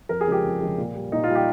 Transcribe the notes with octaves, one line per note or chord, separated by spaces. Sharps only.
F2 A#4
G#4
C#3 F3 G#3 G4
F2
C#3 F3 G#3
A#2
G3
A#2 D#4
F4
G3
G4